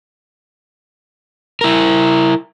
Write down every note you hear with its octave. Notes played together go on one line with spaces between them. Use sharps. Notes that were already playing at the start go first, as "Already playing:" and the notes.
E4 A#4